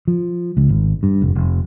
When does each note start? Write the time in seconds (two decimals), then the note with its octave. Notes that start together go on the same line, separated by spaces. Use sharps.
0.08 F3
0.57 C#2
0.69 G#1
1.03 G2
1.22 F1
1.35 F1